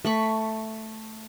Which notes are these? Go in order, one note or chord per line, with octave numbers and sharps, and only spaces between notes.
A3 B5 C#6